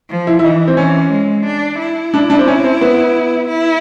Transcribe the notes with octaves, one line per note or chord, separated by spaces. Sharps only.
F3
E4
E4
E3 D#4
C4
E3 C#4
G#3
D4
E4
D4
D4
C4
C#4
C4
B3
E4